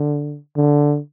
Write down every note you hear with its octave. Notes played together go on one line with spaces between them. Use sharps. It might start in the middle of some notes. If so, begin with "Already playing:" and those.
Already playing: D3
D3